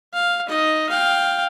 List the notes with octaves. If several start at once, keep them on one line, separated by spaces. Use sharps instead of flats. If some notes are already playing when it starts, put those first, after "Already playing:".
F5
D#4 D#5
F5 G5